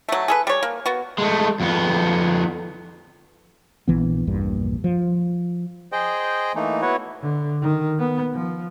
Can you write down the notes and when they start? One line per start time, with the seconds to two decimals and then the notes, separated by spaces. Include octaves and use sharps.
0.09 F#3 A3
0.28 G#4 A4 B4
0.47 G3 C#5
0.63 A#3
0.86 B3 F#4
1.18 G#3 A3
1.60 F2 B3
3.88 A#1 E3 B3
4.27 A#1 E2 G2 A#2
4.84 F3
5.92 G#4 C5 D#5 G5
6.55 E3 A3 A#3 D#4
6.82 B3 E4 F#4 B4 C#5
7.22 D3
7.62 D#3
7.99 B3
8.33 F3